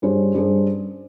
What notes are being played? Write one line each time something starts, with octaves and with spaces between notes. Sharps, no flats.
G2 G3 C#4 G#4 C5
G2 G3 C#4 G#4 C5